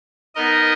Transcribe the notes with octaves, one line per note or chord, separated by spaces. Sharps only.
B3 D#4 A#4 D#5